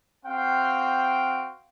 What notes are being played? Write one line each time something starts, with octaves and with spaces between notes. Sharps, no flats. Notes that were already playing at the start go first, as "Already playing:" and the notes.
C4 F#4 F5 G5